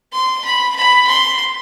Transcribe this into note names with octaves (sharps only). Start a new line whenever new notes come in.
C6
B5
B5
C6